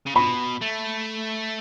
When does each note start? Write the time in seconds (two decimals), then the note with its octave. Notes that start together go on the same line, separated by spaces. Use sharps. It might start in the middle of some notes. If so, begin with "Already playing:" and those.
0.06 C#3
0.15 B2 B5
0.61 A3